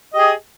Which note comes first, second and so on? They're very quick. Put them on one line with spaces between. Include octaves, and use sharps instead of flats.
D#5 G4 G#4